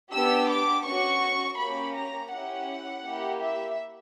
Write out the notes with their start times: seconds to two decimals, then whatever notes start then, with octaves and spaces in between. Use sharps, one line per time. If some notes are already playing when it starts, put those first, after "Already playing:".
0.12 B3 D4 G4 E6
0.48 D6
0.84 C#4 F#4 C#6
1.57 A#3 C#4 G4 B5
1.95 A#5
2.31 C#4 E4 G4 F#5
3.04 A#3 E4 G4
3.41 E5